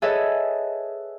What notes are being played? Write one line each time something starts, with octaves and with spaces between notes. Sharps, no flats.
G#4 A4 B4 C#5 D#5 E5